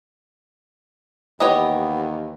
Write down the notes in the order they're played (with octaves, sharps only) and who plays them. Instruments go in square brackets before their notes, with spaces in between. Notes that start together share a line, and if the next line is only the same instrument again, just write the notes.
[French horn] D#2 [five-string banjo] E3 G4 C#5 [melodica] B3 [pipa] B4 D#5